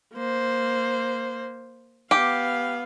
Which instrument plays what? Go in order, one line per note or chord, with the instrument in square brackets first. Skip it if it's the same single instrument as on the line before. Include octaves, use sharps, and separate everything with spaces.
[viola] A#3 C5
[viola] B3 F5 [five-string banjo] G4